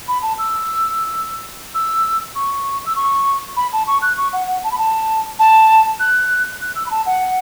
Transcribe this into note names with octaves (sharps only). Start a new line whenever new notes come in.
B5
A5
E6
E6
C#6
E6
C#6
B5
A5
C#6
F#6
C#6
F#5
F#5
A5
B5
A5
A5
F#6
F#6
E6
B5
A5
F#5